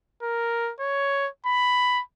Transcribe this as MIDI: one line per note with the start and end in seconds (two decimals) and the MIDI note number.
0.22 0.72 70
0.80 1.29 73
1.46 2.02 83